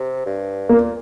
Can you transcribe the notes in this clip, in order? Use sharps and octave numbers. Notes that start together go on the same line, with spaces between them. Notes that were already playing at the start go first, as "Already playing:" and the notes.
Already playing: C3
G2
A#2 A#3